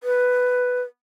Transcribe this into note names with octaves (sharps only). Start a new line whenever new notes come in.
B4